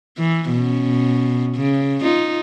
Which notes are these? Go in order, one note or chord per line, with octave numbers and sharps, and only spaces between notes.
E3
B2 C#4
C#3
D#4 F4